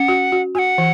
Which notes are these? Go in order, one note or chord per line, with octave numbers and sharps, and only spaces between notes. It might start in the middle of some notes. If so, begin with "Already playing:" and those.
Already playing: C#4 F#5
F#4
F#4
F#4 F#5 G#5
E3